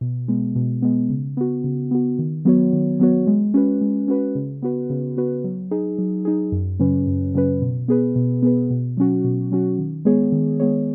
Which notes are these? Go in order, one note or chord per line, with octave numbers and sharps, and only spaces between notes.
B2
G#3 B3
B2
G#3 B3
C#3
B3 F#4
C#3
B3 F#4
D#3
F#3 B3 F#4 C#5
D#3
F#3 B3 F#4 C#5
G#3
C#4 F#4 B4
G#3
C#4 F#4 B4
C#3
B3 F#4 B4
C#3
B3 F#4 B4
F#3
D#4 G#4
F#3
D#4 G#4
F#2
C#3 F#3 C#4 B4
F#2
C#3 F#3 C#4 B4
B2
B3 G#4 B4
B2
B3 G#4 B4
B2
F#3 C#4 F#4
B2
F#3 C#4 F#4
D#3
G#3 B3 G#4 C#5
D#3
G#3 B3 G#4 C#5